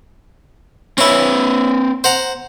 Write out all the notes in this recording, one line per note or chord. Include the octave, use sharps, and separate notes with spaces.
C4 C#4 E4 B4
C5 F#5 A#5